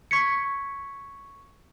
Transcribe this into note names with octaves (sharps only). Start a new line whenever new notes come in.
C#6 G#6 B6 C#7